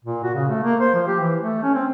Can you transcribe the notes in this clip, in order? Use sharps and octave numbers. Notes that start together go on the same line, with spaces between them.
A#2
F#4
C#3
A3
A#3
C5
F3
G4
E3
A3
C#4
C4